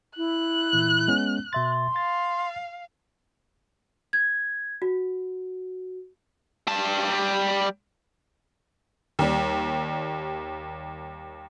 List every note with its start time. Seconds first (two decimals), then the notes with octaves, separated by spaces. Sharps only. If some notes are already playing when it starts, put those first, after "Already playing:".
0.17 E4 F#6
0.73 A#2 E3
1.08 G#3 B3 C#4
1.53 B2 E5 C6 A6
1.96 F5 A6
4.13 G#6
4.82 F#4
6.67 G3 A5
9.19 D#2 G3